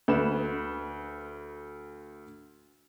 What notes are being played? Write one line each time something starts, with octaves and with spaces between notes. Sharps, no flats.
D2 B4 E7